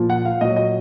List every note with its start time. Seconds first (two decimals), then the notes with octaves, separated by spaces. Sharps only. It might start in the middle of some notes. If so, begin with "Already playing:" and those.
Already playing: A#2 F3
0.10 F#5
0.25 F5
0.41 A#2 F#3 D#5
0.56 D#5